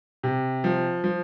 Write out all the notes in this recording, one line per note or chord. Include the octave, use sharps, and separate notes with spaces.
C3
F3
F3